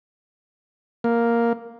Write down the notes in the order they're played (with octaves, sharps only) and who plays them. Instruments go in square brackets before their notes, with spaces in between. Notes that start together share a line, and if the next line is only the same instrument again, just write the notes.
[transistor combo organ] A#3